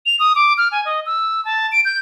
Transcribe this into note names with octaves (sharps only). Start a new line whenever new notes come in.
F7
D#6
D6
F6
G#5
D#5
E6
A5
D7
G6